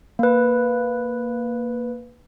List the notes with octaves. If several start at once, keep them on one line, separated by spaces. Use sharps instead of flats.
A#3 B4